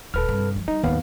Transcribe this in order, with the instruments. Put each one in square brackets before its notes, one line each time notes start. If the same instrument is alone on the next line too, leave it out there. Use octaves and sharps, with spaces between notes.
[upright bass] D#1 [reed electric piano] A4 B4 F6
[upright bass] G2 C3
F3
[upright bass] G3 [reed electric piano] D#4
[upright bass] G#1 F#3 [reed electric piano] D#2 B3 F5